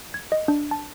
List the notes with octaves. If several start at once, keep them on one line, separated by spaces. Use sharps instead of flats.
G#6
D#5
D4
A5